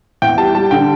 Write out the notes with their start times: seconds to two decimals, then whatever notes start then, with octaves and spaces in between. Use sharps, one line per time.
0.22 E2 G5
0.38 G3 A5
0.55 G3 A5
0.71 D3 G5